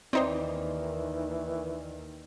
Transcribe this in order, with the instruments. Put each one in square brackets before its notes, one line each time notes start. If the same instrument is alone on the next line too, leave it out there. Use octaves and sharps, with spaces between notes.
[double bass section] D#2 D#3 [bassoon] E3 [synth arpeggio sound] C4 D#4 C5 [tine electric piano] D5